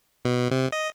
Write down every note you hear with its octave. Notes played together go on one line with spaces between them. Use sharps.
B2
C3
D#5